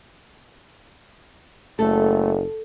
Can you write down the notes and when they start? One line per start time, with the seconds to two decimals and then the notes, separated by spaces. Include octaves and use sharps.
1.79 F#1 A3 A4